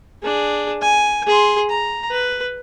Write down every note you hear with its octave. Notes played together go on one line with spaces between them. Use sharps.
D4 G#4
G#5
G#4 C6
A#5
B4